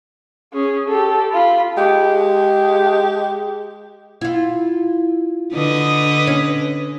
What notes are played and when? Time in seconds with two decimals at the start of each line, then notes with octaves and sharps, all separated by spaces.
0.53 C#4 G#4
0.89 G4 A4
1.32 F4 B5
1.77 G#3 G4
4.21 E4 F4
5.54 D3 B4 D#5
6.27 C#4